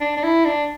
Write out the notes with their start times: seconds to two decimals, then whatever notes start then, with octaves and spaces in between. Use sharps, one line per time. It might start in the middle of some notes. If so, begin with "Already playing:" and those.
0.01 D4
0.17 D4
0.24 E4
0.46 D4